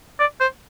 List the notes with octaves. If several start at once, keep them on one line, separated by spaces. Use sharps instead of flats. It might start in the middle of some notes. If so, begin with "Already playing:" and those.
D5
C5